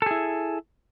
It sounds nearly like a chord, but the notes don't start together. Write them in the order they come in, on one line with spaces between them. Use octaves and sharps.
A4 G#4 E4